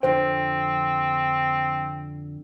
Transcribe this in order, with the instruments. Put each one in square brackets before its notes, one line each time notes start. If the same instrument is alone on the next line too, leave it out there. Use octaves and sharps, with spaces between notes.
[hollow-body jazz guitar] F2 D3 G5 [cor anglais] C4 [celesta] C5